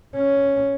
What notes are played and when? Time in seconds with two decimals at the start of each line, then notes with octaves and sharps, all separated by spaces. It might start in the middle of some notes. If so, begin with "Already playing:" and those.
0.15 C#4